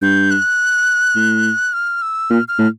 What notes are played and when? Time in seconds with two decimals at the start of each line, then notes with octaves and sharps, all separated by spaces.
0.02 G2 G6
0.30 F#6
1.16 A2
1.73 F6
2.02 E6
2.30 A#2 F6
2.48 F6
2.59 A2